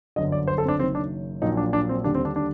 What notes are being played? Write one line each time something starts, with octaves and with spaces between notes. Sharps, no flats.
G1 F#2 D3 D#5
D5
C5
A4
C4
D4
F#1 F#2 D#3 C4
D4
A#1 A#2 F#3 D#4
D4
D4
C4
D#2 D3 G3 D4
C4
D4
D4